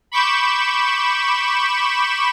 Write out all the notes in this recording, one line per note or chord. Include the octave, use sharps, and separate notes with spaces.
B5 C#6 D6 G6 E7